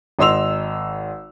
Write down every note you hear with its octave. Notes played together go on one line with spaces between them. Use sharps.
G#1 D#5 C6 E6 F7